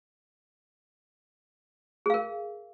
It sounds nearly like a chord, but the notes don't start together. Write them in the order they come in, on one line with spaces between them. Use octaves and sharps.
G#4 F5 A#4